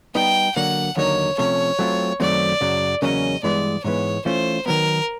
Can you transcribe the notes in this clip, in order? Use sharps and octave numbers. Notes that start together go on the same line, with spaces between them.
G3 B3 D#4 G5
D3 F#3 A#3 F#5
D#2 D3 F#3 A#3 D#4 C#5
C3 F3 A3 C#4 C#5
F#3 A3 C4 F4
F#2 D#3 F#3 A3 C4 D5
F#2 C#3 F#3
E2 C#3 F#3 A#3 C#4 D#5
G2 E3 G#3 B3 D5
G#2 E3 G#3 B3 C#5
E3 A3 C#4 F4 C5
D#3 F#3 B3 A#4